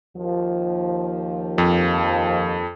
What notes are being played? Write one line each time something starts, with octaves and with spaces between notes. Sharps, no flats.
D#2 F3
F2